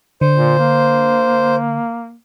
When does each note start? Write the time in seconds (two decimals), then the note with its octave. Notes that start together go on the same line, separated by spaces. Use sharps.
0.21 D3 C5
0.35 A#2
0.59 A#3